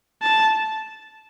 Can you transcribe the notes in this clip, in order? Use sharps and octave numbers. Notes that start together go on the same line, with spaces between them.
A5